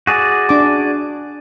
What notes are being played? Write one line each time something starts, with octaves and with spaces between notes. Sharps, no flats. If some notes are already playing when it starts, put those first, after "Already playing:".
F#4 G#4 D5
D4 D6